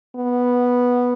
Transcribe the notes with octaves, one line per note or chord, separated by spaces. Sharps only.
B3